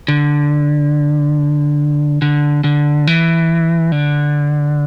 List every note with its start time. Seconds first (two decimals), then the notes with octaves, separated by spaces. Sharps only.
0.08 D3
2.22 D3
2.64 D3
3.07 E3
3.92 D3